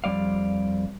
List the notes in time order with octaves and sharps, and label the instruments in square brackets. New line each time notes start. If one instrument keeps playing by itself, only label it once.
[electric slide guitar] F2 G3 D5 F5